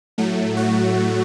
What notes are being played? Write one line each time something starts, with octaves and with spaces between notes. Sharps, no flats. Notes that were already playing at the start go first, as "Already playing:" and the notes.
A2 F#3 A3
F#4